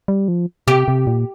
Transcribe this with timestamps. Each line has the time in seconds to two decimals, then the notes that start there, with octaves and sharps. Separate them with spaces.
0.08 G3
0.28 F3
0.68 C3 G4
0.88 C3
1.07 A#2